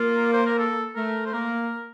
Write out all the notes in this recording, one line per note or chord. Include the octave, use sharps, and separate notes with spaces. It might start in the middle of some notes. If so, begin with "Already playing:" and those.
Already playing: A#3 F4
C5
A#4
A4
A3 A#4
C5
A#3 A#4